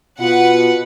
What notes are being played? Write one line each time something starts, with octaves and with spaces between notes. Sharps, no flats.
B2 F4 B4 F#5